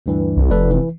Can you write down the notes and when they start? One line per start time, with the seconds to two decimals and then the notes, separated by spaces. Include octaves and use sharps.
0.06 D2 G2 E3
0.36 C2
0.51 F1 A4 B4 D5
0.71 E3